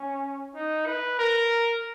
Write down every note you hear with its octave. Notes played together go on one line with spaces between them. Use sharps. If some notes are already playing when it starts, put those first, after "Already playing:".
Already playing: C#4
D#4
B4
A#4